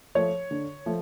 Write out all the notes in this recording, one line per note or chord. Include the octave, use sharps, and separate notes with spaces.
F3 A3 C#5
D3
F3 A3